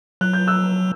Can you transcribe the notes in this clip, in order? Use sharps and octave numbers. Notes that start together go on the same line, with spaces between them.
F#3 F#6
G6
E6 F#6